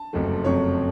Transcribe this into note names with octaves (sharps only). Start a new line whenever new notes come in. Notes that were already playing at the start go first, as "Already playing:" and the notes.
Already playing: A5
F#1 F2 C3 F#3 A3
F#1 F2 C3 F#3 A3 C#5